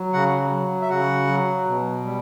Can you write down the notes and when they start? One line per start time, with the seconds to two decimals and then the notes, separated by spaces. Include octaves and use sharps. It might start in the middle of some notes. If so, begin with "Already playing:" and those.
Already playing: F#3
0.13 C#3 F#4 F#5
0.51 F#3
0.81 E5
0.89 C#3 F#4 F#5
1.27 F#3
1.65 B2
2.04 G3